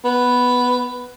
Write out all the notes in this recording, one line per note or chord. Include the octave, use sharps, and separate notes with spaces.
B3